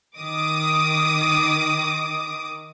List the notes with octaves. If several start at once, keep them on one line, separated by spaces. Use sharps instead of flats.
D#3 D6 D#6